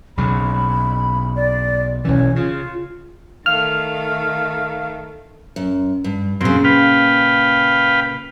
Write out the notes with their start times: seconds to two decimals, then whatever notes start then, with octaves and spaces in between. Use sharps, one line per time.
0.17 B1 C#3 B5
1.36 D5
2.05 B1 E3 C#4
2.36 C#3 F4
3.46 D#3 A3 F5 F6
5.56 F#2
6.04 G2
6.41 F#2 A#2 C#3 C4
6.64 B4 F5 G5